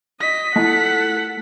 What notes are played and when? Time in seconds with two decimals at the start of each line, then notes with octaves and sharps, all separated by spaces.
0.20 D#5 B6
0.56 A3 E4 F4 A4 D#5 F#5 A5